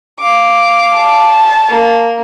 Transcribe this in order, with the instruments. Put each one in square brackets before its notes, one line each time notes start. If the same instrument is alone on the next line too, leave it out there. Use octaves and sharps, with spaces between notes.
[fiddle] F5 D6
[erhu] A5
[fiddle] A#3